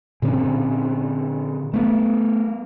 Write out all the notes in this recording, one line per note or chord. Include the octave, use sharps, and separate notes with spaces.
A#2 D3 C4 C#4
A3 B3